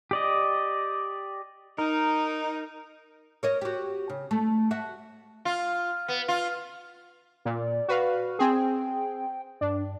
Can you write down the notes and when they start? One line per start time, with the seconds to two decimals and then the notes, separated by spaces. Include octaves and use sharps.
0.11 G4 D5 D#5
1.78 D#4 A#4
3.43 A#4 C#5 D#5
3.61 F#4 G4
4.10 C#3
4.31 A3
4.71 F#4 E5
5.45 F4
6.08 B3
6.28 F4
7.45 A#2 D5
7.88 F#4 B4 F5
8.39 C4 G#4 G5
9.61 G2 D4